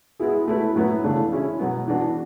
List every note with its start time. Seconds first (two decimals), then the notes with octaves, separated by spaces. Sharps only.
0.20 G#3 B3 E4 G#4
0.48 A3 E4 B4
0.76 A2 F#3 B3 E4 B4
1.04 C#3 E3 A3 D4
1.31 G#3 C#4 E4
1.60 B2 F#3 B3
1.88 E3 B3 D4 F#4